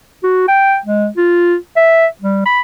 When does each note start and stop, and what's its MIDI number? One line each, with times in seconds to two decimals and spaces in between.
0.24 0.48 66
0.48 0.78 79
0.86 1.07 56
1.17 1.56 65
1.76 2.07 76
2.22 2.41 55
2.46 2.61 83